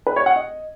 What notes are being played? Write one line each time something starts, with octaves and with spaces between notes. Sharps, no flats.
B4
C#5
F#5
D#5